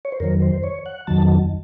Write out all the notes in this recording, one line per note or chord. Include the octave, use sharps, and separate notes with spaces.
C#5
C5
F2 D#3 F#3 A#4
C5
C#5
F#5
F2 D#3 F#3 A5